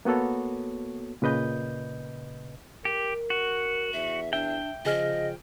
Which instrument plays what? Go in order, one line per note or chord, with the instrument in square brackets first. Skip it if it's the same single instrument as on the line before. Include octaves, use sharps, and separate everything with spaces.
[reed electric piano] A#3 B3 F#4 A4 C#5
A#2 C#3 B4 D#5 G6
[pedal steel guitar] G4 [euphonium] A#4
[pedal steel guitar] F#4
[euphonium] E2 [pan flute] E5
[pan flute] D4 [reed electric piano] E5 [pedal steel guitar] G5
[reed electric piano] C#3 G#4 F6 [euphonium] F3 [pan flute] D#5